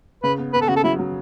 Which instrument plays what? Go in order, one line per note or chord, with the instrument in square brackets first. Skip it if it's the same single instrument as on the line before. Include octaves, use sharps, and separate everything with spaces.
[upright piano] C#3 [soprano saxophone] B4
[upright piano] B3
[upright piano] B3 [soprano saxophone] B4
[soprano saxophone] A4
[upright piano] C#3 [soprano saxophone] F#4
[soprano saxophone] A4
[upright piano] F#3 [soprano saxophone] E4
[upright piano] F#3